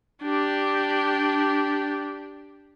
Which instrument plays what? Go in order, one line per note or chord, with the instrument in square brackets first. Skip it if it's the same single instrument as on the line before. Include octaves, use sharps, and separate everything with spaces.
[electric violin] D4 G4